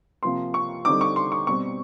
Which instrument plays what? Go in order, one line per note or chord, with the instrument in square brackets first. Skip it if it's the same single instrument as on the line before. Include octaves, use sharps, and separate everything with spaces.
[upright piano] C3 F3 A#3 C6
C#6
D3 G3 C4 D#4 D6
C#6
C6
C#6
B2 G3 C4 C#6